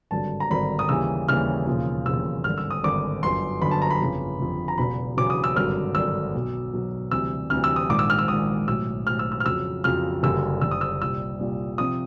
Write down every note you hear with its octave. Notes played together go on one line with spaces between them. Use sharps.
G#1 G2 D3 F#3 A5
A#5
G#1 G2 D3 F#3 B5
D#6
D#2 C#3 E3 G3 E6
D#2 C#3 E3 G3 F6
E1 D#2 C#3 F3
E1 D#2 C#3 F3 E6
G#1 G2 D3 F6
E6
D#6
G#1 G2 D3 D6
G1 F#2 D3 C6
G1 F#2 D3 B5
A5
A#5
B5
G1 F2 C#3
G1 F2 C#3
A#5
E1 E2 C#3 F#3 B5
E1 E2 C#3 F#3 D6
D#6
E6
G#1 G2 D3 F#3 F6
G#1 G2 D3 F#3 E6
B1 B2 F#3
B1 B2 F#3
D2 C3 E3 G3 E6
D2 C3 E3 G3 F6
E6
D#6
A#1 G#2 D#3 D6
E6
F6
E6
A#1 G#2 D#3 D#6
B1 A2 F#3 E6
B1 A2 F#3 F6
E6
E6
F6
F2 C#3 F#3 E6
F2 C#3 F#3 F6
F#1 F#2 D3 G3 E6
F#1 F#2 D3 G3 E6
D#6
E6
C2 A#2 G3 E6
C2 A#2 G3
C3 F3 D#6